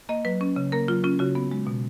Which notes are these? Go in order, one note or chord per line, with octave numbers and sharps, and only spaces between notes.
A#3 D#5
F#3 B4
C#4
C#3
A#3 A#4
F#3 F4
C#4 F4
C#3 F#4
B3
G#3
B2